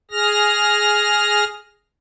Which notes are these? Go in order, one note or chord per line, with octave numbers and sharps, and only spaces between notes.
G#4 F6 A#6